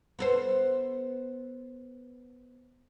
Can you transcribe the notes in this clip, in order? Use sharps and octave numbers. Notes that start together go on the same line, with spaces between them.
B3 A4 C5